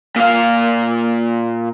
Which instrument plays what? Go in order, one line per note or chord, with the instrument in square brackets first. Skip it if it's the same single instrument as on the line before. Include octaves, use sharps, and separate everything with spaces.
[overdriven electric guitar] A#2 F5